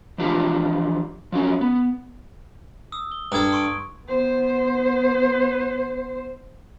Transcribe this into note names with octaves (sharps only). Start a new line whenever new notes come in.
E3 F3 D4 F4 G4
F3 F#3 C#4
B3
D#6 E6
G7
G2 A4 A#5 D#6 G#6
C6 C#6 D7
B3 C5